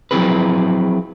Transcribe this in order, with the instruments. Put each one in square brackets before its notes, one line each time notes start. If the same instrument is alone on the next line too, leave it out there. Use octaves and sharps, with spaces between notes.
[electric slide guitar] F3 F#3 C4 E4 G#4 B4